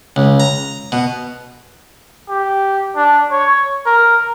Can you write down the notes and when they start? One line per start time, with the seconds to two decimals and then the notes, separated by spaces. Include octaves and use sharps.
0.16 C#2
0.40 A#5
0.92 B2
2.29 G4
2.96 D4
3.31 C#5
3.86 A#4